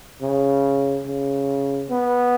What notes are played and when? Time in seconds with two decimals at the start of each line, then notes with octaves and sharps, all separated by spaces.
0.22 C#3
1.06 C#3
1.90 B3